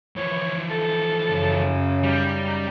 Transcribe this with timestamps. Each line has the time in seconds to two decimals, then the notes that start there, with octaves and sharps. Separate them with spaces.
0.16 E3 F3 C#5
0.70 A4
1.29 F#2 C#3
2.04 G3 D#4